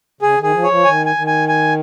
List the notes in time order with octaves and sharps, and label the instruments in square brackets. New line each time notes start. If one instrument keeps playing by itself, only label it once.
[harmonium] C#3 [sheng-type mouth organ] G#4
[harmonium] D#3
[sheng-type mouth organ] G#4
[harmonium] F3
[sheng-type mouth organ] C#5
[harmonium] F3
[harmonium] D#3 [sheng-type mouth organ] G#5
[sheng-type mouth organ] G#5
[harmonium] D#3
[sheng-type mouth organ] G#5
G#5